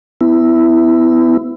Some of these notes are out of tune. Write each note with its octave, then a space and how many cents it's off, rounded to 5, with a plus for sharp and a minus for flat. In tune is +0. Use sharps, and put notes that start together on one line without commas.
B3 +30 E4 +0